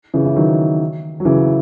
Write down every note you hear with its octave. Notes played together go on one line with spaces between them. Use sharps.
C#3 E3
E3
D#3 F#3
F#3
C#3 E3